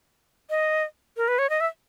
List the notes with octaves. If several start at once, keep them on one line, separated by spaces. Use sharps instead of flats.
D#5
A#4
B4
C#5
D#5
E5